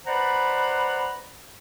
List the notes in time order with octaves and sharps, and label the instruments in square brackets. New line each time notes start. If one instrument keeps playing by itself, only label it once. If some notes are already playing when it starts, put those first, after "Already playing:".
[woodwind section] B4 C5 D5 F#5 A#5 B5